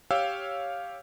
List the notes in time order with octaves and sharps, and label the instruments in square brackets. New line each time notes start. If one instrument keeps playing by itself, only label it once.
[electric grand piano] G4 C#5 F5 G5 E6